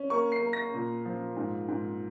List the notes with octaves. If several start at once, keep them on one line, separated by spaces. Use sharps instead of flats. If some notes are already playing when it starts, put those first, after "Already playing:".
Already playing: C#4
A#3 C#6
C7
A#3
A#6
A#2
F3
G#2
G#2